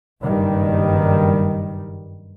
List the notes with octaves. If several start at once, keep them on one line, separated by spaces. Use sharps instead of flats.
F#1 G2 D#3 G3